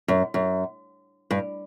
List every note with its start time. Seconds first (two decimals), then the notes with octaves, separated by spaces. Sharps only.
0.08 F#2
0.34 F#2
1.31 G2